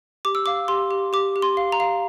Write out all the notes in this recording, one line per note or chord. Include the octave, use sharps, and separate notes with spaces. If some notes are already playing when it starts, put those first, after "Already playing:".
G4 D6
E6
F5 D6
G4 C6
G4
G4 D6
G4
C6
F5
A#5
F5